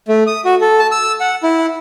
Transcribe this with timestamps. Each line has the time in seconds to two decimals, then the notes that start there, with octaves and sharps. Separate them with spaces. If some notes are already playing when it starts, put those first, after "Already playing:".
0.08 A3
0.27 D#6
0.45 F#4
0.61 A4
0.79 A5
0.92 E6
1.20 F#5
1.43 E4